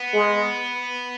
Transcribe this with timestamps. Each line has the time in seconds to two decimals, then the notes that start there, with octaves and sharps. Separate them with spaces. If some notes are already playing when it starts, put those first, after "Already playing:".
Already playing: B3
0.14 G#3